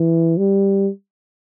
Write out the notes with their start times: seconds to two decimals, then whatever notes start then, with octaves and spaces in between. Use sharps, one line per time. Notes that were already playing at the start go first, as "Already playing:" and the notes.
Already playing: E3
0.38 G3